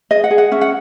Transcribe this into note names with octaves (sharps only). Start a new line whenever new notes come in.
G#4 D#5
F#5
G#4
F#5
C#4 E5
F#5